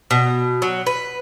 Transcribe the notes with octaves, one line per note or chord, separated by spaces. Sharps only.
B2
F#3
B4